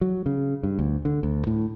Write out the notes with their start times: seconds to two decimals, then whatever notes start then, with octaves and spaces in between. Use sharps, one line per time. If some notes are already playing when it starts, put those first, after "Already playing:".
0.01 F#3
0.26 C#3
0.63 G2
0.79 D2
1.05 D3
1.23 D2
1.47 A2